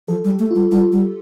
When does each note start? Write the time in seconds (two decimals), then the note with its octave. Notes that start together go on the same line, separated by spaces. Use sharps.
0.08 F3 A4
0.25 G3
0.30 G4
0.39 A3
0.51 G3 F4
0.71 G3 F4
0.92 G3